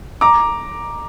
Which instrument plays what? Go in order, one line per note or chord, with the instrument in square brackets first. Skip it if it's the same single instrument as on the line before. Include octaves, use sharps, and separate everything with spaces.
[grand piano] A#5 D6